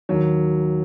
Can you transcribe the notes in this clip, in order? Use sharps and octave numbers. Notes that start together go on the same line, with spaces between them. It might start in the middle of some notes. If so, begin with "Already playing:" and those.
D#2 D#3 F#3